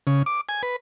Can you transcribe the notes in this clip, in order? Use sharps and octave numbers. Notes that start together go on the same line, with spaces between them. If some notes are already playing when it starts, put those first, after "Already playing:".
C#3
D6
G#5
B4